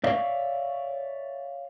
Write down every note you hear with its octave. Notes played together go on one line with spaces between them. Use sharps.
C#5 D5 E5 F5